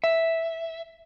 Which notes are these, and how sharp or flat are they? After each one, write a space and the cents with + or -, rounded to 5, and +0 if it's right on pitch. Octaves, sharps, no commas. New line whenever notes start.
E5 -5